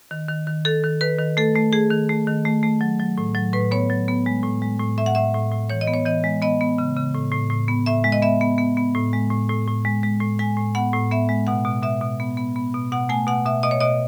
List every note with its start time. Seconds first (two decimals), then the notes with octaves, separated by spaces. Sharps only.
0.11 D#3
0.28 D#3
0.47 D#3
0.65 D#3 A4
0.83 D#3
1.01 D#3 B4
1.19 D#3
1.37 A3 A4
1.55 A3
1.73 A3 G#4
1.91 D#3
2.09 A3
2.27 D#3
2.45 A3
2.63 A3
2.81 F#3
3.00 F#3
3.18 A2
3.35 F#3
3.53 A2 B4
3.71 B3 C#5
3.90 F#3
4.08 B3
4.26 G#3
4.43 A2
4.62 G#3
4.80 A2
4.98 A2 E5
5.06 F#5
5.15 A2 E5
5.34 A2
5.52 A2
5.70 E3 C#5
5.81 D#5
5.87 B3
5.93 C#5
6.05 E3 D#5
6.24 G#3
6.42 B3 D#5
6.61 B3
6.78 C#3
6.96 C#3
7.14 A2
7.32 A2
7.50 A2
7.68 B3
7.86 A2 E5
8.04 G#3
8.12 D#5
8.22 B3 E5
8.41 B3
8.58 B3
8.77 B3
8.95 A2
9.13 G#3
9.30 A2
9.49 A2
9.67 A2
9.85 G#3
10.03 G#3
10.20 A2
10.39 G#3 G#5
10.57 A2
10.75 B3 F#5
10.93 A2
11.11 B3 E5
11.29 G#3
11.47 B2 F#5
11.65 B2
11.83 B2 E5
12.01 B2
12.20 B3
12.37 B3
12.56 B3
12.74 B2
12.92 B2 F#5
13.09 A3 G#5
13.27 B2 F#5
13.45 B2 E5
13.63 B2 D#5
13.71 C#5
13.80 B2 D#5